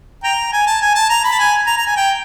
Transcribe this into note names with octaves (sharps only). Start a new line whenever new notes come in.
G5 A#5
G#5
A5
G#5
A5
A#5
B5
A5
G#5
A#5
A#5
G#5
G5